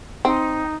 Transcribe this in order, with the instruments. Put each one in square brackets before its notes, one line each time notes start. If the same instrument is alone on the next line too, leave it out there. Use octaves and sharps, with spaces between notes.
[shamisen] C4 [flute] D#4